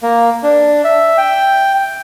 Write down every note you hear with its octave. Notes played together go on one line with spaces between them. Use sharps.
A#3
D4
E5
G5